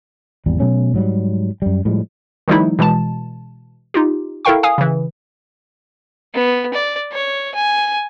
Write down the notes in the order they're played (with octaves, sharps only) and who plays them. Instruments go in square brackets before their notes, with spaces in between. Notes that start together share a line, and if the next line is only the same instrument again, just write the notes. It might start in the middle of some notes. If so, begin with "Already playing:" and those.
[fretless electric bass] G#1 E2 G3
B2 F#3 A3 C#4
G#2 F#3 G3
F#2 G3
A2 F3 G3 G#3
[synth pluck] D#3 F3 G3 A3 D#4 E4
B2 E3 G#3 A5
D#4 F4 G4
E4 A4 A#4 F5 G5 C#6
F5 G#5 D#6
C#3 E3
[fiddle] B3
D5
C#5
G#5